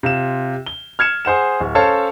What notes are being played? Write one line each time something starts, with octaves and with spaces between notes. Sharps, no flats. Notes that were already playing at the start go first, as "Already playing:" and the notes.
C3 F4 E7
G7
F6 G#6 C#7 E7
G#4 C5 F#5 E7
D1
C#4 A4 C5 C#5 F5 A5